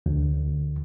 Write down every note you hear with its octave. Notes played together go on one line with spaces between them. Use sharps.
D2